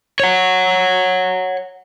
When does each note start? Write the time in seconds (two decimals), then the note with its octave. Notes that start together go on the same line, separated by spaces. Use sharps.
0.20 C#5 F#5